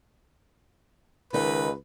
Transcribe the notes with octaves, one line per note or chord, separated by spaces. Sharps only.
C#2 D#3 D#4 B4